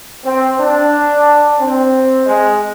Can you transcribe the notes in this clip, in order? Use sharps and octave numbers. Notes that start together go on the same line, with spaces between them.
C4
D4
C4
G#3